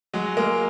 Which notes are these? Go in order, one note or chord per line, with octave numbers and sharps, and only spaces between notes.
F#3 G#3
G#3 A#3